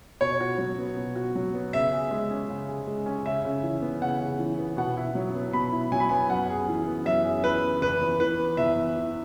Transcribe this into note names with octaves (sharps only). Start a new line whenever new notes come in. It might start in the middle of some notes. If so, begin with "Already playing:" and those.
B2 C#5
F#4
F#3
B3
B2
F#4
F#3
B3
C#3 E5
G#4
G#3
C#4
C#3
G#4
G#3
C#4
C#3 E5
C#3
E3
B3
C#3 F#5
C#3
E3
B3
B2 F#5
E4
F#3
B3
B2 B5
E4
F#3 G#5
B5
B3 G#5
F#2 F#5
G#4
E3
B3
F#2 E5
G#4
E3 B4
B3
E2 B4
E2
E3 B4
B3
E2 E5
E2
E3